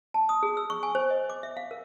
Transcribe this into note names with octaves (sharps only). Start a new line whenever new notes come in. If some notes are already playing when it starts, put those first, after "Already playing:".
A5
D#6
G#4
E6
C#6
G#5
C5
D#5
D6
E5
F5
A#4